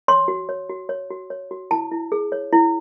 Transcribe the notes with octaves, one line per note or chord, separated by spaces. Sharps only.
C#5 C6
F#4
C#5
F#4
C#5
F#4
C#5
F#4
E4 A5
E4
G#4
C#5
E4